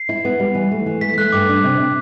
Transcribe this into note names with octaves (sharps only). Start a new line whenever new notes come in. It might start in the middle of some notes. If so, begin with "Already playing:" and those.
Already playing: C7
E4
B3
G3
E3
A3
E3
A3 B6
A3 F#6
G2 D6
D4
C3
C3